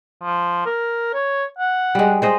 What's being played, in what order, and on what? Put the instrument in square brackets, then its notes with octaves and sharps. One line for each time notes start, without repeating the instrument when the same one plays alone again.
[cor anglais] F3
A#4
C#5
F#5
[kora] G3 G#3
G#3 C5 D#5